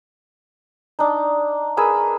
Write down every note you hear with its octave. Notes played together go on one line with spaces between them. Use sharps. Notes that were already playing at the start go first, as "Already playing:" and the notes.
D4 D#4
G#4 A#4 B4 E6